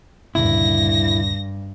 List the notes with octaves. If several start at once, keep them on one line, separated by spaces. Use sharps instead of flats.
D2 G2 A#2 C#3 E4 A#6